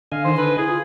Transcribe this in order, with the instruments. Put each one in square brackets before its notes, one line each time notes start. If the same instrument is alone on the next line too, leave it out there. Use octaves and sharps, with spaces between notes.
[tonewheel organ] D3 D#5 G#5 [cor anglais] F5
[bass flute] D#3 [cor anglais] C5
[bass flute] A4 [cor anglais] B4
[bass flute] E4 [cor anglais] G#4
[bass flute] F4